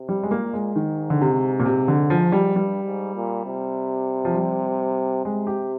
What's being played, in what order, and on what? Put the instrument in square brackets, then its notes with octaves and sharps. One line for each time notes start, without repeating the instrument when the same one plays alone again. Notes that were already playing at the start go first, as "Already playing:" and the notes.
Already playing: [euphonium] C3
[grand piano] G3
G#3
[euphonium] A#2 [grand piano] A#3
[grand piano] G#3
[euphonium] G#2 [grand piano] D#3
[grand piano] D3
C3
A#2
C3
D3
F3
G3
[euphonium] G2 [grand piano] G3
[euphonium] G#2
A#2
C3
[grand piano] F3
G3
[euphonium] C3 [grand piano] G#3
[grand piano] G4